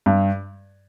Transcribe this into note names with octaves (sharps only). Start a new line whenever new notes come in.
G2